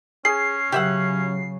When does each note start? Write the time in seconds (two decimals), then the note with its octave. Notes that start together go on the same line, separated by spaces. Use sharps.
0.25 C#4 G#4 C7
0.72 C#3 F#3 G4 E5 F#5